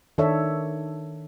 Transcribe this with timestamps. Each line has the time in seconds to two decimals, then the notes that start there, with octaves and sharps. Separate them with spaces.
0.18 D#3 D4 A4 C#5 E5